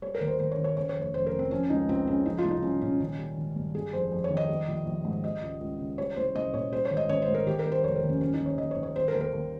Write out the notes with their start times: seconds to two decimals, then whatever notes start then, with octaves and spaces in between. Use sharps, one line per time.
0.02 G3 C#5
0.15 A#4
0.21 D#2
0.27 C5
0.40 D#2 C5
0.51 C#5
0.58 D#3
0.64 C#5
0.77 C#3 C#5
0.89 C#5
0.96 F1
1.02 C#5
1.14 F1 C5
1.27 A#4
1.32 F2
1.39 C4
1.51 F3 C#4
1.70 C#2 D#4
1.89 C#2 C4
2.07 C#3 C#4
2.26 F3 D#4
2.38 F4
2.44 C2
2.51 D#4
2.62 C2 C#4
2.81 A#2 C#4
3.00 D#3 C#4
3.19 G3
3.37 G#1
3.56 G2
3.74 G3 G#4
3.93 F2 C5
4.12 F2
4.24 C#5
4.30 D#3
4.37 D#5
4.49 G3
4.68 A#1
4.86 A#1
5.05 G#2
5.23 G3 D#5
5.42 C#2
5.61 C#2
5.79 C#3
5.98 G3 C#5
6.17 C2 C5
6.35 C2 D#5
6.53 A#2 C#5
6.72 G3 C5
6.85 C#5
6.91 G#1
6.97 D#5
7.09 G#1 C#5
7.22 C5
7.28 G#2
7.35 A#4
7.47 D#3 G4
7.59 A#4
7.65 G3
7.72 C5
7.84 F1 C#5
7.96 A#4
8.03 D#2
8.09 C#4
8.21 G3 C#4
8.33 D#4
8.40 D#2
8.46 C#5
8.58 D#2 D#5
8.71 C#5
8.77 D#3
8.83 C#5
8.95 G3 C5
9.08 A#4
9.15 D#2
9.21 A#4
9.33 D#2